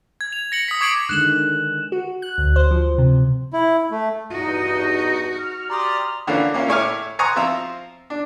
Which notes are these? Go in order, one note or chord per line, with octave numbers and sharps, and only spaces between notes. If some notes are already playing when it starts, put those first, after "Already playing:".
G#6
F7
A#6 C#7 F#7
D#6 B6
C#6 D6 G#6 C7 D7 F#7
D3 D#3 G#3 F#6 E7 F#7
F#4
F#6
D2
C5
F3
C3
E4
A3
E2 G2 D#4 F#4 D#5
F6
G4 D5 A#5 C6 D#6
D3 E3 A#3 C#4 D4 F4
A#3 C#4 E4 F4
A2 E4 C#5 G#5 D6 F6
C5 F#5 G#5 A#5 C#6 D#6
F3 C4 F4 E5 A#5
D4